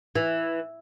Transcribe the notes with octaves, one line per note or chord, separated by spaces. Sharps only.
E3